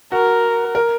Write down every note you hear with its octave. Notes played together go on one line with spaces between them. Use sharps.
F#4 A#4
A#4